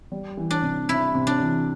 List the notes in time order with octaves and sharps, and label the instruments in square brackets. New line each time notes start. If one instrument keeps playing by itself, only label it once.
[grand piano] G3
E3
[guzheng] D4
[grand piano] C3
[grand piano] C3 [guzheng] E4
[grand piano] C3
[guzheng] D4
[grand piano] E3